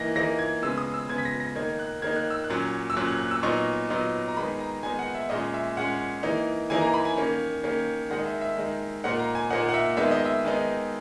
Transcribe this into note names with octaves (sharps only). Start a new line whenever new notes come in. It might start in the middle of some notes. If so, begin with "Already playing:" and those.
Already playing: E3 A#3 D#4 A#6
E3 A#3 D#4 A#6
G#6
C#3 G#3 B3 E6
D#6
E6
C#3 G#3 B3 G#6
B6
A#6
A#6
D#3 A#3 D#4 G#6
F#6
D#3 A#3 D#4 G#6
F#6
E6
F#6
A#2 F#3 C#4
E6
A#2 F#3 C#4 F#6
F#6
F#6
E6
A#2 F#3 B3 D#4 C#6
A#2 F#3 B3 D#4
A#5
D#3 G#3 B3 D#4 B5
A#5
D#3 G#3 B3 D#4 G#5
F#5
E5
A#2 G#3 C#4 D#5
E5
A#2 G#3 C#4 F#5
E3 A#3 D#4
E3 A#3 D#4 G#5
A#5
B5
G#5
D#3 A#3 C#4
D#3 A#3 C#4
D#3 G#3 D#4 F#5
D#5
E5
E5
D#3 G#3 D#4
A#2 A#3 D#4 F#5
A#5
G#5
A#2 A#3 D#4 F#5
F#5
E5
D#3 G#3 B3 D#4 E5
D#5
E5
D#3 G#3 B3 D#4